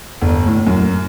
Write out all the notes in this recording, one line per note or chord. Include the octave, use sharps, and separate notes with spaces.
G1
A2
F#2